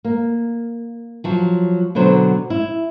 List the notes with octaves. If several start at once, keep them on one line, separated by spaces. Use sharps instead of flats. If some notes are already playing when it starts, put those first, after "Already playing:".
A#3
F3 F#3
B2 D3 F#3 C5
E4